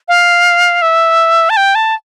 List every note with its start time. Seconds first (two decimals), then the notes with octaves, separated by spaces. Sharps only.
0.08 F5
0.82 E5
1.50 A5
1.57 G5
1.75 A5